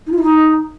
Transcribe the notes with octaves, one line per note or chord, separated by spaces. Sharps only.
D#4
F4
E4
D#4